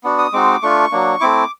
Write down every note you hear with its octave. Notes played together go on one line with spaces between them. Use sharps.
B3 D4 F#4
D#6
G#3 C4 D#4 F#4 D6
A3 D4 F4 C#6
F#3 A#3 D4
A3 C4 E4 D6